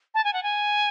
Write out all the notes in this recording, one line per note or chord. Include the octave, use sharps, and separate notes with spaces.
A5
G#5
F#5
G#5